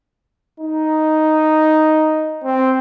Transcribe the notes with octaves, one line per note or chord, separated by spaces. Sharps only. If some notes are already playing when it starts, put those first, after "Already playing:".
D#4
C4